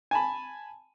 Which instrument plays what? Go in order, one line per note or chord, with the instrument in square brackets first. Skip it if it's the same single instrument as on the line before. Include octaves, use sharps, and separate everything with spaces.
[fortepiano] G#5 A5 B5